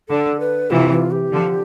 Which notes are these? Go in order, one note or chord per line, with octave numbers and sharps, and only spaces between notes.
D3 A4
B4
C3 E3 F4
F4
G4
D3 F3